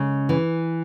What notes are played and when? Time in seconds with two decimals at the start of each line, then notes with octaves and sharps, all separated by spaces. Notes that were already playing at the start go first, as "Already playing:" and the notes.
Already playing: C#3 G#3
0.29 E3